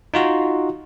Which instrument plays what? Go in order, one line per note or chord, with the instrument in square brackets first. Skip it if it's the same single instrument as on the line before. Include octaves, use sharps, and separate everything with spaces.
[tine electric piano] D#4 F4 F#4